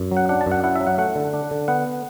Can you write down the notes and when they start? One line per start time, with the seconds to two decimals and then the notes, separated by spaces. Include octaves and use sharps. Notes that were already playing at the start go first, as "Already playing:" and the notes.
Already playing: F#2
0.11 F#3
0.17 F#5
0.29 D4 F#5
0.41 A5
0.46 F#2
0.51 F#5
0.64 E4 F#5
0.76 E5
0.81 F#3
0.87 F#5
0.98 A3 F#5
1.15 D3
1.34 D4
1.51 D3
1.68 B3 F#5